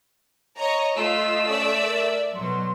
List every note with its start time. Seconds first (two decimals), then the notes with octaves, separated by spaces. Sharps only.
0.57 C#5 D#5 A#5
0.96 A3 F4 D#5 E6
1.48 C#4 D5 E5
1.81 A#4
2.35 B2 F#3 C6